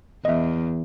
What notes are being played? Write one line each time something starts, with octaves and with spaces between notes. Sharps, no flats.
E2 D#5 E5